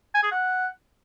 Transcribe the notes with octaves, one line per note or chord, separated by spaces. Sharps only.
G#5
G#4
F#5